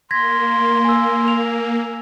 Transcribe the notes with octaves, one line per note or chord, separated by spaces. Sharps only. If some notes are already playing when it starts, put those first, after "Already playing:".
A#3 C6 G#6 A#6 B6
G#5 E6
F7